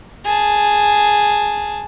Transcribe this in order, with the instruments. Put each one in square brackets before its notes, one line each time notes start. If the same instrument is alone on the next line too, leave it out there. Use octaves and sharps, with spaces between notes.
[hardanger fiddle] G#4 A5